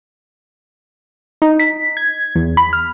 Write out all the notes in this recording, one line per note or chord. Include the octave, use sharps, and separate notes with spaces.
D#4
B6
G#6
E2
B5
F6